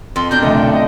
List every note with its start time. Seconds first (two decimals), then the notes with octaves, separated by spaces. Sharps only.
0.16 F2 C6
0.31 B2 D4 A#4 G6
0.43 B1 D3 A3 D#5
0.56 G5
0.72 D#5